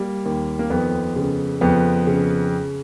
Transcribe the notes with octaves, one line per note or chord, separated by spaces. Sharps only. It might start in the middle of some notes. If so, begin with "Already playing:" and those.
Already playing: G3 A#3
D#2
A#3
F2 B3
C#3
F2 B3
C#3